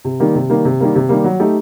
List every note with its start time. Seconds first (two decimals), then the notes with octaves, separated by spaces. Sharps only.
0.05 C3
0.20 D#3 G3 A#3
0.35 C3
0.50 D#3 G3 A#3
0.65 C3
0.80 D#3 G3 A#3
0.95 C3
1.09 D#3 G3 A#3
1.24 F#3
1.40 A3 D#4 G4